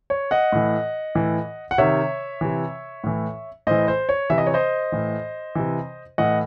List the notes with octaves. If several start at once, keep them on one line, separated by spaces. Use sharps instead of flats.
C#5
D#5 F#5
A2 E3
A2 E3
F#5
C3 D#3 C#5 E5
C3 E3
A2 E3
A2 E3 C5 D#5
C5
C#5
C3 E3 E5
D#5
C#5
C5 D#5
A2 E3
C3 E3
A2 E3 D#5 F#5